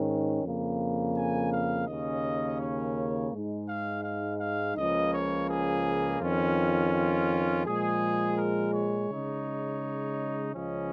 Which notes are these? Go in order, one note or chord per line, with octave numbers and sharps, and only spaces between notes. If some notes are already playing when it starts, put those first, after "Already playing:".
Already playing: G#2 D#3 C#4
F2 C#3 A#3
G#5
F5
D#2 C#3 A#3 C#4 D#5
C#5
G#2 G#3 D#4
F5
F5
F5
C#2 C#3 F3 A#3 D#5
C#5
G#4
F2 D#3 C#4 F4
F4
A#2 F3 G#3 G#4
A#4
C#5
C#3 G#3 D#4
C#2 C#3 F3 C#4 D#5